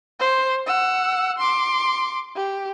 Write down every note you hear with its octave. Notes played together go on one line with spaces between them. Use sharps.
C5
F#5 E6
C6 D6
G4